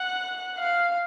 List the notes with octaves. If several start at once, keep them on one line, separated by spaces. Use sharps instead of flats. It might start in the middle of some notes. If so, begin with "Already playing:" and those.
Already playing: F#5
F5